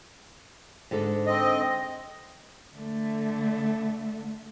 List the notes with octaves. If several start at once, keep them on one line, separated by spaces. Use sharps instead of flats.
G#2 D3 A4
C4 D#5
D3 A3